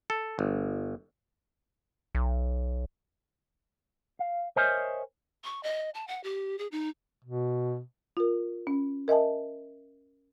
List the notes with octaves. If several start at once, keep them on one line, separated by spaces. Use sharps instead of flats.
A4
G1
B1
F5
A#4 C5 C#5 D#5 E5 G#5
C#6
D#5
A5
F#5
G4
G#4
D#4
B2
F4 A#4
C#4
A#4 D#5 E5 G#5 A5